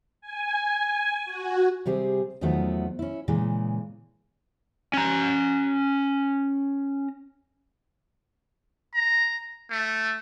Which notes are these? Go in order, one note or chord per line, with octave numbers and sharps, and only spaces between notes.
G#5
F#4
C3 G3 C4 G#4
E2 D#3 F3 F#3 A3 B3
C#4 E4
A#2 C#3 E3 G#3
C#4 A#5
A#5
A3